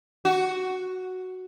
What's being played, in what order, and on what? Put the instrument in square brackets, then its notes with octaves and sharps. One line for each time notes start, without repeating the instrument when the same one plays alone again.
[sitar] F#4